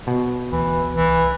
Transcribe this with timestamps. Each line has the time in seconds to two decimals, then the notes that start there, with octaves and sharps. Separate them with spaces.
0.07 B2
0.52 D2 E3
0.93 C2 E3